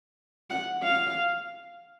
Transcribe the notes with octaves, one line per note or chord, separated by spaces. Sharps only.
F#5
F5